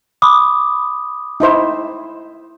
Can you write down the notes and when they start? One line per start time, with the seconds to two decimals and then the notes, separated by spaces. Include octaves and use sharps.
0.22 B5 D6 D#6
1.40 D#4 E4 C5